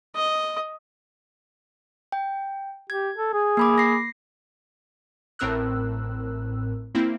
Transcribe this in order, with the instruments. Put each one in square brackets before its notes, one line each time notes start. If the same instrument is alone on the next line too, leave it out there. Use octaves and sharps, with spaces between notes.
[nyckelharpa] D#5
[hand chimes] G5
[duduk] G4 [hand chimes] G#6
[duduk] A4
G#4
[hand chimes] A#3 B5 D6
A#6 C7
[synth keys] A1 A2 C4 A#4 E6 F#6
A#3 C4 E4